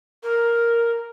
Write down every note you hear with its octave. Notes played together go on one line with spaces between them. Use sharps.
A#4